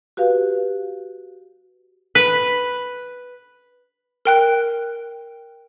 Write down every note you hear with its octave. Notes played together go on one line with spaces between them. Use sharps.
F#4 G4 B4 F5
B4
A#4 G5 F#6